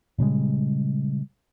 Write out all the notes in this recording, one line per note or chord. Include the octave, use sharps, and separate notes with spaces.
A#2 C#3 G3 G#3